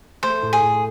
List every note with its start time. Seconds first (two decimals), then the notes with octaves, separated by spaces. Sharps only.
0.23 A3 C5
0.42 A2
0.53 G#4
0.62 A2